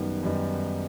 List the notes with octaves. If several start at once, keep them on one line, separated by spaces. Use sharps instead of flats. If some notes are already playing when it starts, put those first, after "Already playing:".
Already playing: F#2 D#3 G3 B3 D#4
F#2 D#3 G3 B3 D#4